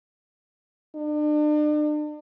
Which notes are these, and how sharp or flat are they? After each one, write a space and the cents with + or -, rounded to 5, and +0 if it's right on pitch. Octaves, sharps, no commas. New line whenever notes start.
D4 +40